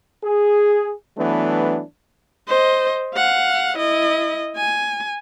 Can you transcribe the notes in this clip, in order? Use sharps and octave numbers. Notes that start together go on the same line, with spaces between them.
G#4
E3 F#3 A3 B3 D4
C5 D#5
F5 F#5
E4 D#5
G#5